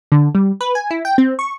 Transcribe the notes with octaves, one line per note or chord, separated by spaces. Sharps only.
D3
G3
B4
G#5
E4
G5
C4
C#6